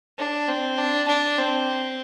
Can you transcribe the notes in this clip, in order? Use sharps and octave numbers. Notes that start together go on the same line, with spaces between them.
D4
C4
D4
D4
C4